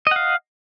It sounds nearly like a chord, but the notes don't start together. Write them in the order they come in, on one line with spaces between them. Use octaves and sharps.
D#5 F#5 F5